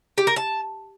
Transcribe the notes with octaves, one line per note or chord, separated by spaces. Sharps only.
G4
A#4
A5